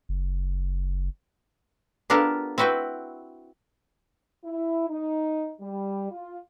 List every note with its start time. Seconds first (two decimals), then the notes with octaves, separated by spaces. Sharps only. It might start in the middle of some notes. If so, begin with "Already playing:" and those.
0.09 F#1
2.10 B3 D4 F4 G4 A4 A#4
2.58 C4 E4 F#4 B4 G5
4.45 E4
4.89 D#4
5.61 G3
6.11 F4